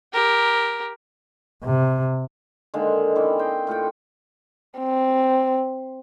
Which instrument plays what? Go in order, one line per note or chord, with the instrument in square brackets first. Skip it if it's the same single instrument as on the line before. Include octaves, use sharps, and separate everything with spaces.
[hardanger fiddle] G4 A#4
[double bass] C3
[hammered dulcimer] D3 D#3 G#3 A#3
E3 C4 C#4 D5
D#5 G5 C6
A2 F4 F#5 G5
[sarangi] C4